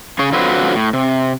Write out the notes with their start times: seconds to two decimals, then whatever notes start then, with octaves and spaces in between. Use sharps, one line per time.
0.19 C#3 C#4 G#4 C#5
0.33 D3 F#3 C4 F4 F#4 B4
0.75 A2
0.93 C3